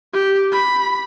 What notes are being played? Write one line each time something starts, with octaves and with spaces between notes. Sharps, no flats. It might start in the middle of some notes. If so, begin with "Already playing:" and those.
G4
B5